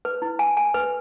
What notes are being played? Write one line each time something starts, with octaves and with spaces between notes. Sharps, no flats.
B4
E4
G#5
G#5
B4